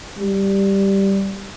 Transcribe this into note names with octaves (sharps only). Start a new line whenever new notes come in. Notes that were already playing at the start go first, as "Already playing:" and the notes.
G3